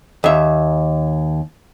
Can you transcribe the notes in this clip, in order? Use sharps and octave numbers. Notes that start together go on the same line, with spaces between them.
D#2 E5